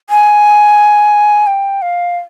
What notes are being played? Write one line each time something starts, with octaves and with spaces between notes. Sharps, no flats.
G#5
G5
F5